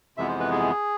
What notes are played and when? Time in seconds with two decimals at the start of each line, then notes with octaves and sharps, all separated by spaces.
0.17 F2 C3 E3 G#3 B3 E5
0.29 C5
0.40 B4
0.51 G#4